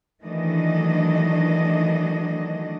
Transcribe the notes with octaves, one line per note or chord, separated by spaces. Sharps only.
D#3 E3 F#3 A3 D4 D#5